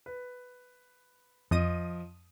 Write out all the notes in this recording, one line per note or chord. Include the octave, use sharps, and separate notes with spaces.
B4
F2 F3 D#5 D#6 D#7